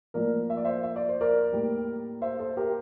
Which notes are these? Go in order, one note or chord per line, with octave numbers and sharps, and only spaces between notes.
A2 F3 A#3 A#4 D5
E5
D5
C5 E5
E5
D5
C5
A#4 D5
A2 G3 A#3
C5 E5
A4 C5
G4 A#4